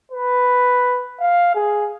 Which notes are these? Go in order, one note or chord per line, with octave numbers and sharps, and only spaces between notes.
B4
F5
G#4